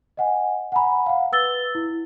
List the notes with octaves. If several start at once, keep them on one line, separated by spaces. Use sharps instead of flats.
D#5 F#5 G#5
F#5 G#5 A#5 B5
F5 F#5
B4 E6 A6 G7
E4